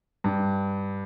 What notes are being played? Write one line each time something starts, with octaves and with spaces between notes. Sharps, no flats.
G2